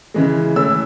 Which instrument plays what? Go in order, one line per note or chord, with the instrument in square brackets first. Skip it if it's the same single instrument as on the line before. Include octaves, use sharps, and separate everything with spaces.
[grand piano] C#3 E3 G#3
E3 A3 C#4 E6